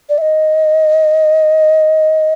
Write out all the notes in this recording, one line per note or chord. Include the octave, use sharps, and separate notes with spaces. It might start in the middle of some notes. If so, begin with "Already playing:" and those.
D5
E5
D#5